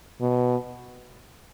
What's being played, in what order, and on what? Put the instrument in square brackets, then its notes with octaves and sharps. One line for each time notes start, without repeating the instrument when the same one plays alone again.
[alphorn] B2